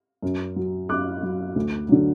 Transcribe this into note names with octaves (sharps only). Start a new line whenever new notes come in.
F#2
F#3
F#2 D6 F#6
F#3
D2
D3 F#3